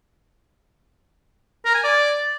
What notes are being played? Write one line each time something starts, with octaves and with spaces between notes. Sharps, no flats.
A#4
G#5
D5